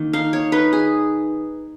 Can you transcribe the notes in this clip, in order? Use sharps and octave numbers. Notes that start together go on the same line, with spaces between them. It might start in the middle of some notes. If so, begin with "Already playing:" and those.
Already playing: D#3 A#3
D#4 F5
C#5
D#4 B4
G#4